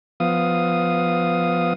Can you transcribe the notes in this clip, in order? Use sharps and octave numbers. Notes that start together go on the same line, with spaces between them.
F3 B3 F5 D#6